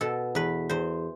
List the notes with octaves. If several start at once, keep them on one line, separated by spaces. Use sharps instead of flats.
B2 A4
E2 B4
E2 C5